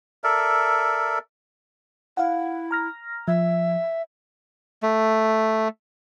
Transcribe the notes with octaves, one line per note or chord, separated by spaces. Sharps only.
A4 A#4 D5 E5
E4 F5 F#5
A#5 F6 A#6
F3 E5
A3